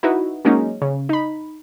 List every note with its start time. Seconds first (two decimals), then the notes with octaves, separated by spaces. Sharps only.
0.03 D#4 E4 F#4 B4
0.45 F#3 G#3 A#3 C#4 D#4
0.82 C#3
1.09 D#4 B5